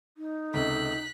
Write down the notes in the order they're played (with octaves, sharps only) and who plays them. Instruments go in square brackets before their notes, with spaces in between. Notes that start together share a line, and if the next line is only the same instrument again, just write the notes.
[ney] D#4
[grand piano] C#2 C3 [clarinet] A4 [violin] F#6 B6